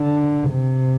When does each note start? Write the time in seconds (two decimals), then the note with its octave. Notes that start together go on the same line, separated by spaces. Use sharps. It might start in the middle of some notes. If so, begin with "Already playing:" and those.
Already playing: D3
0.50 C3